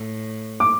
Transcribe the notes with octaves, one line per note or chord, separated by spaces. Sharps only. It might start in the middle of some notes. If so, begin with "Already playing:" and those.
Already playing: A2
D6